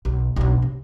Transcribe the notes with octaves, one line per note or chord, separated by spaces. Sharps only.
B1
B1 D4
C3